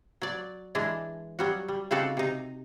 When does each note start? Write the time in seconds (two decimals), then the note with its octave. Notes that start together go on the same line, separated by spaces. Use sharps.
0.22 F#3 D5
0.75 E3 G#3 D4
1.39 F#3 G3 F#4
1.68 G3
1.91 C#3 C4 D#4 F#4 G4 A4
2.17 C3 D#4